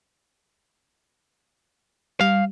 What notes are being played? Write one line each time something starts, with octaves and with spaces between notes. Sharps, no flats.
G3 F5